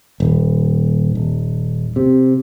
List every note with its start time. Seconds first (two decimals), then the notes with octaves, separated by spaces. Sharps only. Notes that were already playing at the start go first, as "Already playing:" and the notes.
0.20 D#1
1.15 D#1
1.96 C3